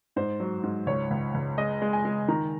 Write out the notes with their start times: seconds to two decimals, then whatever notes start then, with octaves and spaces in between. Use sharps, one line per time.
0.16 G#2 C5
0.40 F#3
0.63 G#2
0.86 C#2 C#5
1.10 C#2
1.34 C#2
1.58 G#3 D#5
1.82 G#3
1.93 G#5
2.05 G#3
2.28 D#3 A#5